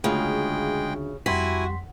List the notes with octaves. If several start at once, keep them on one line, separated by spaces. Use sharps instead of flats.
D2 C#3 G#3 F4 F5 G5
F2 G3 E4 F#4 G#5 C6 B6